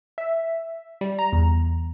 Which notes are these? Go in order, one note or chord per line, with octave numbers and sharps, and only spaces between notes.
E5
G3
A#5
E2